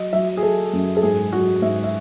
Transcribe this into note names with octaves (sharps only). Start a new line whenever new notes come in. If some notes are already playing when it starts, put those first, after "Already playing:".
Already playing: F#3 D#5
F#3 E5
G#4
F#3 A4
F#2
A4
G#2 G#4
F#3 F#4
G#2 E5
E5